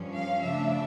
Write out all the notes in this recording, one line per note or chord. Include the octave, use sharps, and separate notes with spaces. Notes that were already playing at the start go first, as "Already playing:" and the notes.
Already playing: G2 F3 C#4
F5
C#3 F3 A3 D4 E5